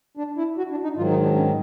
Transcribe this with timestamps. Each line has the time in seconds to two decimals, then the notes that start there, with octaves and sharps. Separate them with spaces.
0.17 D4
0.37 E4
0.58 F#4
0.71 D4
0.83 D#4
0.97 G#2 D#3 F#3 F4
1.10 D#4
1.23 D4
1.36 C#4